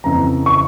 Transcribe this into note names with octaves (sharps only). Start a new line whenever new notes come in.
F2 C#3 E3 A#5
C#6